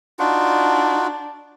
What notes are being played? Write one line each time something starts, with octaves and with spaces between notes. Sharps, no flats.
D4 D#4 F4 F#4